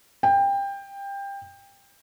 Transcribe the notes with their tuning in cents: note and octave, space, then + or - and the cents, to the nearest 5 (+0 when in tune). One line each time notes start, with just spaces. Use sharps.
G5 +20